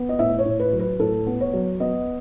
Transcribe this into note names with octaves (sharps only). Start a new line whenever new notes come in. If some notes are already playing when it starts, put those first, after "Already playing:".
Already playing: B3
D#5
A2 E5
C#5
A2
B4
F#3
B4
A2 A4
B3
C#5
F#3
B3 D#5